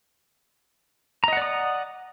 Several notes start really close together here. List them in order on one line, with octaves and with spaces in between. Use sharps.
A#5 D#5 F#5 D5 D#6